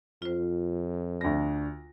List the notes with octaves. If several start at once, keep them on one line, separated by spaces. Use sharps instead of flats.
F2 F4 C5
D2 D4 A#6